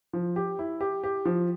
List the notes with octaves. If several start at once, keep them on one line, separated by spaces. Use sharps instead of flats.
F3
G4
E4
G4
G4
F3